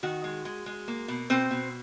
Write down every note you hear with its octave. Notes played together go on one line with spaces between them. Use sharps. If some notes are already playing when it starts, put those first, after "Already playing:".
D#3 F#4
G#3
G#3
G#3
A#3
B2
B2 C4 C5
B2